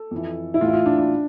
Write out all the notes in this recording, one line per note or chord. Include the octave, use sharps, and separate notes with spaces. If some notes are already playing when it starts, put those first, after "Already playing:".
Already playing: A4
F2 E3
E4
A2 E3 F4
E4
F4
D4
D4